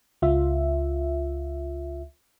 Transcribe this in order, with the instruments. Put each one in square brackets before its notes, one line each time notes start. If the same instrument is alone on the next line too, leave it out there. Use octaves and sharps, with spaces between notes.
[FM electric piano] C#2 F4 E5